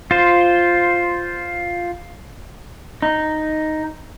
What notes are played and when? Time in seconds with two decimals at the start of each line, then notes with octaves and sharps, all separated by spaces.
0.11 F4 C5
3.02 D#4